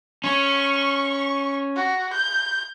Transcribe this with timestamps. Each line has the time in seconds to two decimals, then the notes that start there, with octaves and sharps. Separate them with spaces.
0.24 C#4 C#6
1.75 F#4
2.13 G6